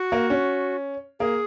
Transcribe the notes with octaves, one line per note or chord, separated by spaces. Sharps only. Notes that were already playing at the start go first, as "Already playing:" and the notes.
Already playing: F#4
A#3
C#4
A#3 G#4